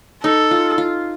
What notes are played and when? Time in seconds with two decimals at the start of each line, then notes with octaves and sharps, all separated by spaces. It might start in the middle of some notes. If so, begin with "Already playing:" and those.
0.23 D#4 A4
0.51 F4
0.78 F4